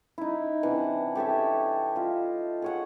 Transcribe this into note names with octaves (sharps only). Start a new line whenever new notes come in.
D#4 E4
C3 E3 D4 F#5
G4 A4 C#5 E5
F4 D#5
G#4 C#5 F#5